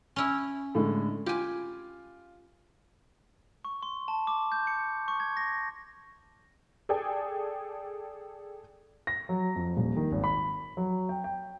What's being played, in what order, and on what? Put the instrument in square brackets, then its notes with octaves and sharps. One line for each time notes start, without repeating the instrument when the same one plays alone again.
[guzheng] C#4 E4
[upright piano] A2 D3 G#3
[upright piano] F4 [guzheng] G4 G#5
[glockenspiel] C#6
C6
A5
D6
G6
C#7
C#6
G#6
A#6
[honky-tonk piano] G#4 A4 D5 G5 G#5
[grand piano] A#6
F#3
F2
D#1
D#3
G#1
B5
F#3
G5
G5